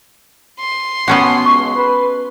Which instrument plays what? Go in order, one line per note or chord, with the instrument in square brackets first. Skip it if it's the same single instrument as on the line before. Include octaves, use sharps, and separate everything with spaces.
[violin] C6
[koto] B3 C#4 F#4 [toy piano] G4 A5
[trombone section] C#2 [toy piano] C#6
[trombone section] B4